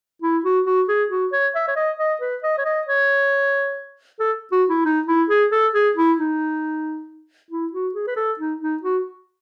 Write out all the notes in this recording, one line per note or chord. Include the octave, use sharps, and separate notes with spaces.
E4
F#4
F#4
G#4
F#4
C#5
E5
C#5
D#5
D#5
B4
D#5
C#5
D#5
C#5
A4
F#4
E4
D#4
E4
G#4
A4
G#4
E4
D#4
E4
F#4
G#4
B4
A4
D#4
D#4
F#4